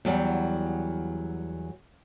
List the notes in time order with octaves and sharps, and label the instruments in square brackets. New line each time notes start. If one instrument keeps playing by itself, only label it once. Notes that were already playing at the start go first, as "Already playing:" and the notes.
[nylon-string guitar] E2 F#3 G3